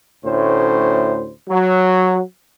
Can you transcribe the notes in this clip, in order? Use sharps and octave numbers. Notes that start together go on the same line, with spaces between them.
D2 A2 C#4 C5
F#3